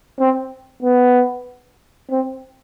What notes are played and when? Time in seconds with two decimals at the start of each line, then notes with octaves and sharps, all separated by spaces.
0.20 C4
0.83 B3
2.10 C4